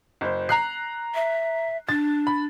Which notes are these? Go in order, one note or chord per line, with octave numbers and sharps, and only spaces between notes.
F#1 C5
A#5 F#6 C7
E5
D4 A6
B5